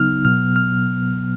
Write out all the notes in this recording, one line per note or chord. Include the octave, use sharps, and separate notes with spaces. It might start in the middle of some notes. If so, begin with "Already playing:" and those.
Already playing: C#3 F#3 B3 D#4 F6
B2 F#3 B3 F6
F6